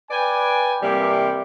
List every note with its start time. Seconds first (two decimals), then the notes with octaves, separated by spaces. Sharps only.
0.10 B4 D5 G5 G#5
0.82 C3 E3 G3 A#3 G4